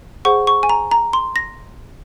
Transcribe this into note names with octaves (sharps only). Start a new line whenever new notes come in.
G#4 C5 F#5 C#6
C#6
G#5
A#5
A#5
C6
A#6